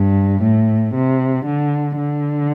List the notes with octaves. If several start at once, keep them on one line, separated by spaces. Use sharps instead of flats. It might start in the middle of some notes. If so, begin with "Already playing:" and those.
Already playing: G2
A2
C3
D3
D3